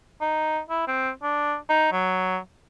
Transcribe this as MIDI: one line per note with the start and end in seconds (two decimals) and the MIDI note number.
0.21 0.60 63
0.70 0.82 64
0.88 1.09 60
1.22 1.55 62
1.69 1.88 63
1.92 2.38 54